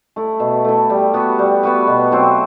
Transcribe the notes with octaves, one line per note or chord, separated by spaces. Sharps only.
A3 E4
B2
A3 E4
G3
B3 F#4 B4
G3
B3 F#4 B4
B2
F#3 C4 E4